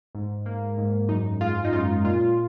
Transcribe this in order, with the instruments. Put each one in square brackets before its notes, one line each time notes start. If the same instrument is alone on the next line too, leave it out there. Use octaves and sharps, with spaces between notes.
[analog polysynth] G#2
A#3
G#2
F#2 D#4
G#3 F4
D#4
F#2 F4
A#2 F4